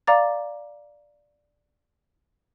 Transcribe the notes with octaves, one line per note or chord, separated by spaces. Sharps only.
D5 F5 A#5 D6 A6